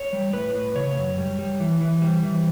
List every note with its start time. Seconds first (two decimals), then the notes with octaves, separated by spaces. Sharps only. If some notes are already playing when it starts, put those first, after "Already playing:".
Already playing: C#5
0.13 G3
0.33 A2 B4
0.55 A2
0.75 C#3 C#5
0.97 F#2
1.18 G3
1.39 G3
1.60 E3
1.81 E3
2.02 G3
2.24 E3